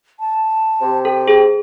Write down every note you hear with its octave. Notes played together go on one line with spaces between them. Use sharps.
A5
C3
A4 G5
G#4